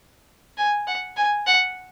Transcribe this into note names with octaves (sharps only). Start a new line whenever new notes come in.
G#5
F#5
G#5
F#5